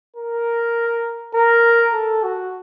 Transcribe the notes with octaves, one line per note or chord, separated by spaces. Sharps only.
A#4
A#4
A4
F#4